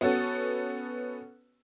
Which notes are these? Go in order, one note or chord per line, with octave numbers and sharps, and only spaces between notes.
B3 C#4 F#4 A4